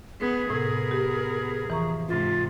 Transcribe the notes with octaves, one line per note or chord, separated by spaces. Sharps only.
B3 G#4
A2 C3 B3 A#4 G#6
G4
F2 E3 A#5 C#6
G#2 C3 F4